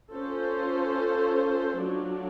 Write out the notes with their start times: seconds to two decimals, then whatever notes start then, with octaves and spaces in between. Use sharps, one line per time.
0.12 C#4 F4 A4 C5
1.80 F#3 A3 D4 F4